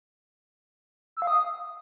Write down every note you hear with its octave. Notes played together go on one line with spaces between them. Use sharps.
E6
F5
D#6